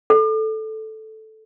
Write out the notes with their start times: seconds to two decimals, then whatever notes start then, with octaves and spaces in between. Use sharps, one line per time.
0.10 A4